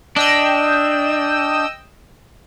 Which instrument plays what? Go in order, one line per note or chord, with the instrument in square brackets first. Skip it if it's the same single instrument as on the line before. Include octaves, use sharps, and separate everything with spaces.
[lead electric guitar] D4 [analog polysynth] D#5 G5 E6